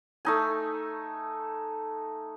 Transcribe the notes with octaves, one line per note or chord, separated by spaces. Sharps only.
A3 D#4 G#5